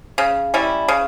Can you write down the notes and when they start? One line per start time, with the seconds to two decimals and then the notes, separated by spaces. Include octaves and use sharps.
0.18 C#3
0.54 G3 C#4 E4
0.88 C#3